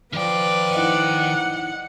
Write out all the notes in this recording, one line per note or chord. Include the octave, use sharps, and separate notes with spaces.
D#3 F3 B4 D5 G5
D#4 E4 D#5 F#5